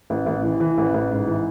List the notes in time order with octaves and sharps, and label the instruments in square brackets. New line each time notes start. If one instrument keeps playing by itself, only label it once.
[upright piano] A1
A1
E3
E3
A1
A1
G#2
E3